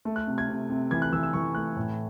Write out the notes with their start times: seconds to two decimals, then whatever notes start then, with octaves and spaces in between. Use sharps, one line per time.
0.05 A3
0.16 F#6
0.27 C3
0.38 G#6
0.48 C3
0.70 C3
0.91 E3 G#6
1.02 F#6
1.13 E3 E6
1.23 E6
1.33 E3 C#6
1.55 A3 F#6
1.76 A2